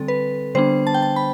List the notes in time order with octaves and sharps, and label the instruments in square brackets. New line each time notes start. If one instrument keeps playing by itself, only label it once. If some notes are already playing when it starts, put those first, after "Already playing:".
Already playing: [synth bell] D3 G3 C4 A4
B4
D3 G3 B3 D4 C5
A5
G5
A5
B5